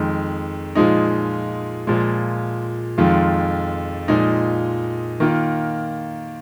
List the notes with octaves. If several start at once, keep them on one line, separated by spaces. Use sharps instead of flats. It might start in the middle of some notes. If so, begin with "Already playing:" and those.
Already playing: F2 D#3 G#3
A#2 F3 G#3 D#4
A#2 F3 G#3
F2 D#3 G#3 F4
A#2 F3 G#3 D#4
D#3 A#3 F4